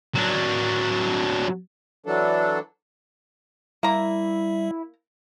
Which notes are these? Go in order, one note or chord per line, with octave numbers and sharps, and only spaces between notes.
F#3 D4
E3 F#3 D4 A4
G3 A#3 E4 E5 A#5